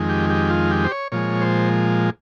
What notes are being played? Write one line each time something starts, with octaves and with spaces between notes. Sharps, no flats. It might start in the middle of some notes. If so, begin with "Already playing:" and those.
Already playing: F2 D#3 G#3
G4
G4
F4
G4
C5
C#5
A#2 F3 G#3 C#5
C5